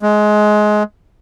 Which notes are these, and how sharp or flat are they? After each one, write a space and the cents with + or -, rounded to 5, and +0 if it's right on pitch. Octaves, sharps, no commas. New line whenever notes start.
G#3 +20